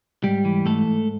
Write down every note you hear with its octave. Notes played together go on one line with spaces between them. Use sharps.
G#2 G3 G4
E3
G#2 A3 A4
G#2